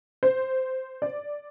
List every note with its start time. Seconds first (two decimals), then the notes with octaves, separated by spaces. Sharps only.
0.23 C5
1.02 D5